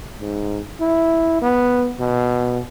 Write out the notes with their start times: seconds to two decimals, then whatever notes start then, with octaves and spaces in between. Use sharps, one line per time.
0.20 G#2
0.80 E4
1.41 B3
1.99 B2